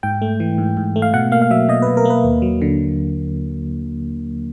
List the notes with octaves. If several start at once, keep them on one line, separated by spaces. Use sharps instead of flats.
G#2 G5
A3
E3
G#2
G#2
A3
F5
B2 F#5
A#3 F5
F5
F#3 E5
B2 D#5
B4
B2
A#4
A#3 B4
D#2
F#3
D3